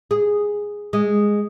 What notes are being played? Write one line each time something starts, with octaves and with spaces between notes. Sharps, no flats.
G#4
G#3